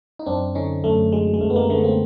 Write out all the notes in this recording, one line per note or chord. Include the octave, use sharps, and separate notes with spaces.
D#4
F#2 C4 D4
D3 C#4 D#4
F#2 A3
F#3 G#3
G#3
F#2 A3
B3
G#3 A#3
D3 A3 B3
A#3 C4